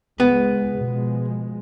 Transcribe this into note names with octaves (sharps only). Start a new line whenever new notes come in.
C#2 G#3 B3
B2 F3 G#3